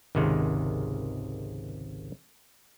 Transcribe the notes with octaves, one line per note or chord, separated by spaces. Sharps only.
G#1 C#2 C3 D#3 G#3